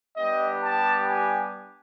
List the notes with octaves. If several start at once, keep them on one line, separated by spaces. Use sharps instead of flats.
G3 B3 D4 G4 D#5
A5
G#5